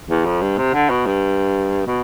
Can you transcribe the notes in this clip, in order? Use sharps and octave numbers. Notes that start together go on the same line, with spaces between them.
E2
F2
G2
C3
D3
B2
G2
B2